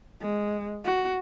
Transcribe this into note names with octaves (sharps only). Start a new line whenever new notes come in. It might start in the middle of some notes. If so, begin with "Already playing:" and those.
G#3
F#4